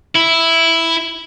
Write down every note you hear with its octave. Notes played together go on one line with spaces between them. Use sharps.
E4